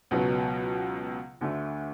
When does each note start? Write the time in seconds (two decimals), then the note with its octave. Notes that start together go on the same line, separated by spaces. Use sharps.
0.11 C#2 B2 F#3 B3
1.41 D2 D3 A3